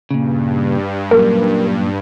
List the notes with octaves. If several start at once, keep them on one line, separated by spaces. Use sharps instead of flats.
G2 A#2 C#3
F#2 A#2 A#4